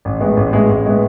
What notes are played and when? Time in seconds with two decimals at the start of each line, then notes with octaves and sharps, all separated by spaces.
0.05 A1
0.21 A2 G#3 B3
0.37 A1
0.53 A2 G#3 B3
0.69 A1
0.85 A2 G#3 B3